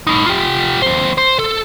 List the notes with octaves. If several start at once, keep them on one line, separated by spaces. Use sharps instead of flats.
A2 D#4
F4 G4
D#2 C5
C5
A4